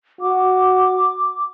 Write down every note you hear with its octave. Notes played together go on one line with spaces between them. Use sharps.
F#4 D6